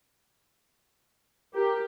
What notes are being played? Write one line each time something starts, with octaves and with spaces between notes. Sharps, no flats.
G4 A#4